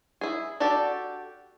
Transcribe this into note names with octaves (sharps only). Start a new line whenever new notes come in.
E4 G#4
D4 F#4 G4 A4 D5